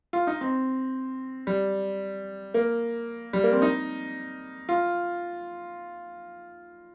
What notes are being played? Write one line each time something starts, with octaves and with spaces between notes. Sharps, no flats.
F4
D#4
C4
G3
A#3
G3
A#3
C4
D#4
F4